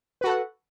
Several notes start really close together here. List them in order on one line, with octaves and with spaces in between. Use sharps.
B4 F#4 A4 F#5